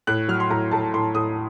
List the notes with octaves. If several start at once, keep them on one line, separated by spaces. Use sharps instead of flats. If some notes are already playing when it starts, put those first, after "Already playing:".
A2 F#6
F#3 F6
C6
A2 A#5
A2 A5
A2 C6
A2 D#6